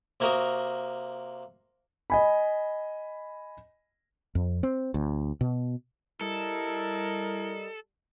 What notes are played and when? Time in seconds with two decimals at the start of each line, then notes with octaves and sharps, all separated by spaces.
0.20 C3 A#3 F#4 A#4 D#6
2.10 D#5 G#5 B5
4.35 F2
4.63 C4
4.94 D2
5.41 B2
6.21 G3 E4 A4 A#4 D#5